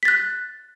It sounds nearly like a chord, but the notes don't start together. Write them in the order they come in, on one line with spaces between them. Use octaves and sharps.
B6 A6 F#6